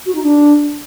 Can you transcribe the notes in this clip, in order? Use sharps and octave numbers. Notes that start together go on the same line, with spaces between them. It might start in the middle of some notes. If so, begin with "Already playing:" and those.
F#4
D#4
D4